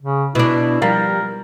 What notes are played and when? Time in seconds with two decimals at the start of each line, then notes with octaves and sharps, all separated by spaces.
0.02 C#3
0.35 B2 D4 E4
0.82 F3 G3 A#4 F5